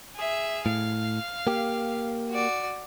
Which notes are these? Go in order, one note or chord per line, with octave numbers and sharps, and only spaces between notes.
G#4 E5
A2 F5
A#3 G4
F#4 D5